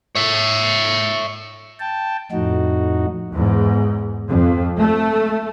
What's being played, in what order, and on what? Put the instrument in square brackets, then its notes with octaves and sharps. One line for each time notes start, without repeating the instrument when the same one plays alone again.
[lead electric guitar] C#5 E5
[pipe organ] G5 A5
F2 A2 D#4 F#4
[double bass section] E2 G#2
F2
A3